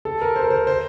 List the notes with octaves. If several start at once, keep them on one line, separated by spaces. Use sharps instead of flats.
A4
A#4
C5
A#4
C5
C5